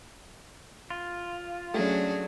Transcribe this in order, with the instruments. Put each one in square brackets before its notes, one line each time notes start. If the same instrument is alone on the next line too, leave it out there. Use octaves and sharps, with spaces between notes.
[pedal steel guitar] F4
[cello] F#3 [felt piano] A3 C#4 [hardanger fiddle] D4 G#4